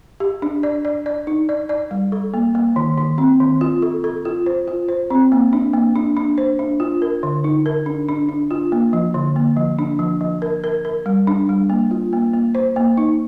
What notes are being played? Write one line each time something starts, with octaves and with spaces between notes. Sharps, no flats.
G4
D4
D5
D5
D5
D#4
D5
D5
G3
A4
A#3
A#3
D#3
D#3
C4
D#3
F4
A4
A4
F4
C5
F4
C5
C4
A#3
D4
A#3
D4
D4
C5
D4
F4
A#4
D3
D#4
A#4
D4
D4
D4
F4
A#3
F3
D3
A#3
F3
D4
F3
F3
A#4
A#4
A#4
G3
D4
G3
A#3
F4
A#3
A#3
C5
A#3
D#4